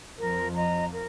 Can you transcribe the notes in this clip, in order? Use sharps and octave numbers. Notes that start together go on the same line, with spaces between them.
F2 F3 A#4
D#5 A#5
A#4